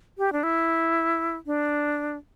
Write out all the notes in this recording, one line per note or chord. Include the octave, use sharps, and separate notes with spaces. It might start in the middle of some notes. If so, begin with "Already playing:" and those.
G4
D4
E4
D4